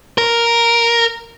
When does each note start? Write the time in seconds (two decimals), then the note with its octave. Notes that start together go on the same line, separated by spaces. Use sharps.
0.18 A#4